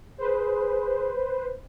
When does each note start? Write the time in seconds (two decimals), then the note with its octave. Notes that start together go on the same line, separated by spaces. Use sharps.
0.18 G#4 B4 C5